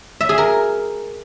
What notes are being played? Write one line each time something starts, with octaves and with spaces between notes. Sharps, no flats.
E5
G#4
A#4